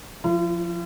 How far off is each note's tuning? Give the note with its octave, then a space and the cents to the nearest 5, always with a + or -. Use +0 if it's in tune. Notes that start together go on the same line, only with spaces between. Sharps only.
F3 +10 F4 -45